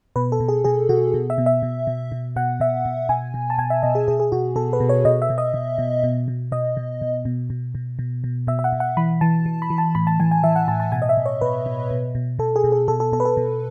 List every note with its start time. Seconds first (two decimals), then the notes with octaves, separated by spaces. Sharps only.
0.16 B2 B4
0.32 A4
0.40 B2
0.48 G#4
0.64 B2 G#4
0.89 B2 F#4
1.14 B2
1.30 E5
1.38 B2
1.46 E5
1.62 B2
1.87 B2
2.12 B2
2.36 B2 F#5
2.60 B2 E5
2.85 B2
3.09 B2 G#5
3.34 B2
3.50 A5
3.58 B2 G#5
3.70 E5
3.83 B2 D#5
3.95 G#4
4.08 B2 G#4
4.20 G#4
4.32 B2 F#4
4.56 B2 A4
4.73 B4
4.80 B2
4.89 C#5
5.05 B2 D#5
5.22 E5
5.30 B2
5.38 D#5
5.54 B2
5.78 B2
6.04 B2
6.28 B2
6.52 B2 D#5
6.77 B2
7.02 B2
7.25 B2
7.50 B2
7.75 B2
7.99 B2
8.24 B2
8.47 B2 E5
8.59 E5
8.64 F#5
8.72 B2
8.80 F#5
8.97 E3 B5
9.21 E3 A5
9.46 E3
9.62 B5
9.70 E3
9.78 A5
9.95 A2 B5
10.07 A5
10.20 E3 G#5
10.31 G#5
10.43 E3 E5
10.56 F#5
10.68 A2 A5
10.80 A5
10.92 B2 G#5
11.02 D#5
11.09 E5
11.17 B2
11.26 C#5
11.41 B2 B4
11.66 B2
11.90 B2
12.15 B2
12.39 B2 A4
12.56 G#4
12.64 B2
12.72 G#4
12.88 B2 A4
13.00 A4
13.12 B2 A4
13.20 B4
13.25 A4
13.37 B2